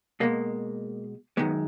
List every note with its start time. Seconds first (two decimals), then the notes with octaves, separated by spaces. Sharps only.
0.20 B2 G#3 A#3
1.37 F#2 D#3 G#3 B3